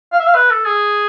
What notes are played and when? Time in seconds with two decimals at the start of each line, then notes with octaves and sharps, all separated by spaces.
0.13 F5
0.20 E5
0.27 F5
0.35 B4
0.50 A4
0.65 G#4